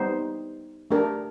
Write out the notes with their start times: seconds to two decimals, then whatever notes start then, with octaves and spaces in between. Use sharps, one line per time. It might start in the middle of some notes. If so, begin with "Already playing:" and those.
Already playing: G3 B3 D#4 G4 C5
0.91 A3 D4 G4 A#4